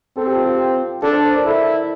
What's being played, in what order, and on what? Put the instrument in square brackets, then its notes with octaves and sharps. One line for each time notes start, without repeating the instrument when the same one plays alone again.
[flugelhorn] C4 [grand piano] A4
[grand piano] G4
F4
G4
[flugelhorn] D4 [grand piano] A4
[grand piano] C5
D5
A#4
[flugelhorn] E4 [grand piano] A4